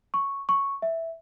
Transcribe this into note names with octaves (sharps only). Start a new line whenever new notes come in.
C#6
C#6
E5